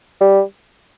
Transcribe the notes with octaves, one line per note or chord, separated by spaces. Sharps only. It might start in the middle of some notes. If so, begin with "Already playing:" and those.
G3